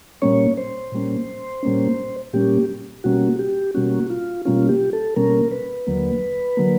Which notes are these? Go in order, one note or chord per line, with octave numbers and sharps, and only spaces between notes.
A#2 G3 A#3 C#4 C#5
C5
A#2 G3 A#3 C#4
A#2 G3 A#3 C#4
A#2 G3 A#3 C#4 G4
B2 G3 A#3 C#4 F#4
G4
B2 G3 A#3 C#4 F#4
F4
B2 G3 A#3 C#4 F4
G4
A4
B2 G3 A#3 C#4 A#4
B4
D#2 D3 F#3 A#3
D3 F#3 A#3